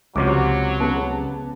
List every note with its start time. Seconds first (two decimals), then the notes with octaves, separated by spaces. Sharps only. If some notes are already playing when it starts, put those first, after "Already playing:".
0.16 C#2 C3 F3 F#3 D6
0.80 C#3 B3 A5